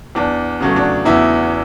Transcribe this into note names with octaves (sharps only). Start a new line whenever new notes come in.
E2 D4
C#3 F#3 A3
D4
E2 E4